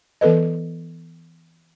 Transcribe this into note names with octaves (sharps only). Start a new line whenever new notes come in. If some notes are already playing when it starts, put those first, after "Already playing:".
E3 B3 A4 B4 D#5